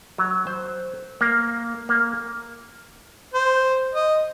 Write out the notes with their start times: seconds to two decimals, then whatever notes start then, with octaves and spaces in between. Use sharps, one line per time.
0.18 F#3
0.47 C5
1.21 A#3
1.89 A#3
3.34 C5
3.95 D#5